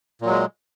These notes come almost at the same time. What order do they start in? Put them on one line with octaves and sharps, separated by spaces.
A#2 F#3 G#3